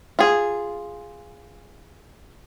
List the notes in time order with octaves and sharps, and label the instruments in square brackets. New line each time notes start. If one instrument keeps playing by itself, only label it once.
[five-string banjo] F4 G#4